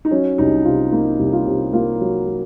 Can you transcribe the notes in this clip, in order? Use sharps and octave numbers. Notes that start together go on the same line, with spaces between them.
D#4
F#3 C#4
C2 D#4
C3 F4
A#3 D#4
C2
F4
C3
A#3 F4
F#3
F#3